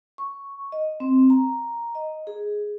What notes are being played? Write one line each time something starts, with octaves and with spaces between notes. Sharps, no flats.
C#6
D#5
C4
A#5
D#5
G#4